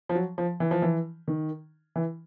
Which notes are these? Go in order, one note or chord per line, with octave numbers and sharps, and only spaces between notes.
F3
F#3
F3
E3
F3
E3
D#3
E3